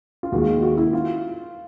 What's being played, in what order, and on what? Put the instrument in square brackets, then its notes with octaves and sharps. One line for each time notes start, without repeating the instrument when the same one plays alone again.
[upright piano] F4
[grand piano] D#2 D#3 G#3 [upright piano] F#4
[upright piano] F#4
E4
F4